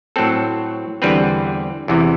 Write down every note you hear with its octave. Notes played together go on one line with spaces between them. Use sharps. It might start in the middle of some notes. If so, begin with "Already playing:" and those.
A2 F#3 C4 A4
E2 D3 G3 C4 B4
E2 C3 E3